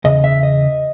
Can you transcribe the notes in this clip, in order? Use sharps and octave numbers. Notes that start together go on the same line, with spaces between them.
E2 C#3 D#5
E5
D#5